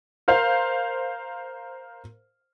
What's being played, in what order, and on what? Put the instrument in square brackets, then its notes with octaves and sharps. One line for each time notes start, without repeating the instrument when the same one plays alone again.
[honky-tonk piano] A#4 C5 F5